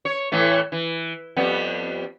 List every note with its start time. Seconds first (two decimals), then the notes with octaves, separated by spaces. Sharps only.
0.05 C#5
0.32 A2 E3 A3
0.72 E3
1.36 F2 G3 B3